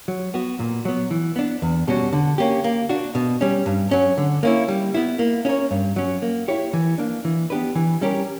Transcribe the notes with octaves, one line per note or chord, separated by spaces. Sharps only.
F#3
B3 F#4
A#2
F#3 B3
E3
B3 D4
E2
B2 G3 C#4 F#4
D3
A#3 C#4 G4
A#3
D4 F#4
B2
G3 C#4
G2
F#3 C#4
D3
A#3 C#4 E4
G3
B3 E4
A#3
C#4 E4 A#4 C#5
G2
F#3 C#4
A#3
E4 G4 C#5
E3
A#3 D4
E3
B3 D4 G4 B4
E3
G3 C#4 G4 A#4